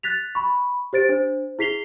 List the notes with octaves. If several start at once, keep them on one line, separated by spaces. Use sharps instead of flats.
F#6 A6 B6 F7
B5 C#6
G4 C5 A6 D7
D4 C5
E4 G#4 B6 C7 F7 G7